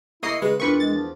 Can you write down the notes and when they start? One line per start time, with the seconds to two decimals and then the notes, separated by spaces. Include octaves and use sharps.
0.23 A#3 E4 G#4 D#5 C#6 F#6 C7 C#7
0.42 C#3 G#3 B4
0.60 E2 D4 F4 A#4 B4 C#6
0.80 G#3 A6
0.94 F3